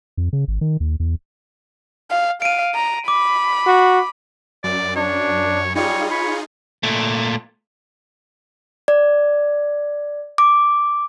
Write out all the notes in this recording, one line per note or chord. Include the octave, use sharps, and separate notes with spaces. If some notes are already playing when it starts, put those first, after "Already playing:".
F2
C#3
G#1
D#3
D#2
E2
F5
F5 D7 D#7
A#5
B5 D6
F#4
F#2 D5
D4 C#5
G3 D#4 F4 G#4 C#5
C#5 B5
A#2 A3
D5
D6